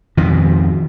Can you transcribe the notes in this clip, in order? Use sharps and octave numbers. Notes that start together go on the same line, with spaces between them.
F2 G#2 B2 D#3